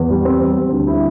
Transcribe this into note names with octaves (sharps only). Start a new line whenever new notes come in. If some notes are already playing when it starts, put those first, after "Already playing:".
Already playing: E2
G3
C4
C4
G3
D2
E4